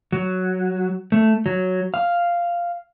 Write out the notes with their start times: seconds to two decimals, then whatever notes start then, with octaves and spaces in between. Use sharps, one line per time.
0.12 F#3
1.12 A3
1.46 F#3
1.94 F5